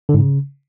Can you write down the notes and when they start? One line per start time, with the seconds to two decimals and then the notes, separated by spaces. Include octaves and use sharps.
0.09 D3
0.14 G#2
0.19 C#3